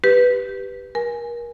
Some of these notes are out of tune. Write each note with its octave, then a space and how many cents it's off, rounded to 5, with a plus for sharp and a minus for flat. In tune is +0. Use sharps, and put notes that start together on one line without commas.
G4 +0 B4 +0
A#4 +30 G#5 +0